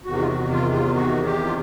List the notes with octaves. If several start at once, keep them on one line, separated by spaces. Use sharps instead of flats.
E2 C3 D#3 F#4
F4
F#4
F4
F4
F#4
G4
F4